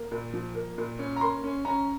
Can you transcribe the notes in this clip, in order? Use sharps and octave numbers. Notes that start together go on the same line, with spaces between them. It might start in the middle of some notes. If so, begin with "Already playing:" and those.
Already playing: A#3
A#2
F3
A#3
A#2
C#4
A#5
A#3 C6
C#4
C#4 A#5